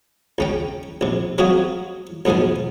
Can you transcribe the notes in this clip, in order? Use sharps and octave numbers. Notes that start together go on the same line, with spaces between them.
C#2 C#4 G5
A#1 C3
F#3 C4 F4 F#4 G#4 C#5
B1 G#2 B2 F3 G#5